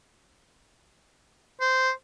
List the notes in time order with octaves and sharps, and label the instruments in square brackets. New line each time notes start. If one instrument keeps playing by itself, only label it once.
[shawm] C5